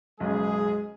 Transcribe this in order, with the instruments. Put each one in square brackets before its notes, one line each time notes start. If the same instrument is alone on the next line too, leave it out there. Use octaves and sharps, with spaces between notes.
[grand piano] F#1 B1 [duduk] G#3 [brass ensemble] G#4